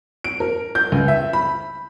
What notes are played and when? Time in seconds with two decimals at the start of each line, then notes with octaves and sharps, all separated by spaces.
0.24 D7
0.40 A#4
0.75 G6
0.92 C#2
1.08 E5
1.33 B5